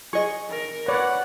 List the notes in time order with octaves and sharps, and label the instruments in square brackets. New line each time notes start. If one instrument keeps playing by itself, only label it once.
[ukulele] G#4 D#5 [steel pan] C#6
[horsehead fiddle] A#4
[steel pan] B4 C#5 D5 [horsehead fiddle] F#5